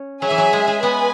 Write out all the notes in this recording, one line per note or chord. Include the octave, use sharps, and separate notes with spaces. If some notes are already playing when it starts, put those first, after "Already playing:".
Already playing: C#4
F#3 G#4 E5 G#5
E3
F#3
G#3
G#3
B3 B4 G#5